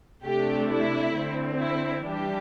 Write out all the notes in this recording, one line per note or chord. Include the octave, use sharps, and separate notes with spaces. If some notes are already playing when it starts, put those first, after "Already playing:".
C3 A3 D4 G4
E4
D3 C4
E4
E3 G3 D4 G4